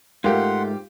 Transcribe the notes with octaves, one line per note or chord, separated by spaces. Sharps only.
G#2 A3 F4 G4 A#4 F#5 C6